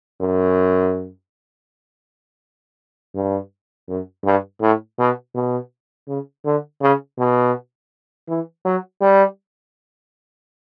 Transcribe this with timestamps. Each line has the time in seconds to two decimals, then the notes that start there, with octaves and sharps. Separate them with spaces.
0.21 F#2
3.15 G2
3.88 F#2
4.24 G2
4.61 A2
4.99 B2
5.35 B2
6.08 C#3
6.45 D3
6.81 C#3
7.19 B2
8.28 E3
8.65 F#3
9.01 G3